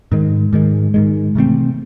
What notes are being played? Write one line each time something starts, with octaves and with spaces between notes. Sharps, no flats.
G#2 D#3 G#3
G#2 D#3 G#3
G#2 D#3 G#3
C3 E3 A3 C4